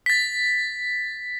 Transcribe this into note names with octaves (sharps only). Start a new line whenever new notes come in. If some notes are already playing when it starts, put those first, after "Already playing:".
A6 B6